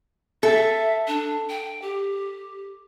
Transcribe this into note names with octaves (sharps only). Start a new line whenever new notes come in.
A4 E5
D4
G5
G4